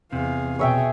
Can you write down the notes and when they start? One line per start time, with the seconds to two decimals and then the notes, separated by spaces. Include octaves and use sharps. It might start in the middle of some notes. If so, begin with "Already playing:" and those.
0.13 E2 C3 G#4 F5
0.59 B2 G#4 C#5 E5 G5